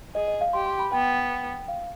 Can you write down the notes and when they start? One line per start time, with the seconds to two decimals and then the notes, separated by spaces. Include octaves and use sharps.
0.15 G#4 D#5
0.28 D#5
0.41 F5
0.53 G4 C6
0.66 C6
0.79 B5
0.92 B3 G5
1.68 F5